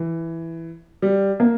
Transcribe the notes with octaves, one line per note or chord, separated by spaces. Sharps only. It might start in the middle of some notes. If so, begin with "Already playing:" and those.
Already playing: E3
G3
A#3